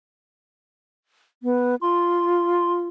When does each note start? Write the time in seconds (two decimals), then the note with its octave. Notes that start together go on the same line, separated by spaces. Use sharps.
1.43 B3
1.81 F4 C6